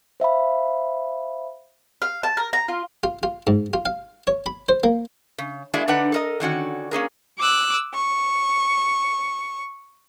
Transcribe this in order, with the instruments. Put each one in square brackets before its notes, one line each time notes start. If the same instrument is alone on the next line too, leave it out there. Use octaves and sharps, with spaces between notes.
[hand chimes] C5 E5 F5 B5
[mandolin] F5
A5
A#4
A#5
F4
[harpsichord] F4
F4
G#2
F4
F5
C#5
B5
C5
A#3
[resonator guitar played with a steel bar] C#3
G#3 A#3 D4 E4 F#4 G#4
D3 D4 D#4 B4 F#5
A4 A#4 D#5
D3 D#3 C#4 F#4
A#3 C#4 G#4 A#4
[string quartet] D6 E6 F#6
C#6